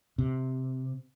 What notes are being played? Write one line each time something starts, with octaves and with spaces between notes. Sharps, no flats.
C3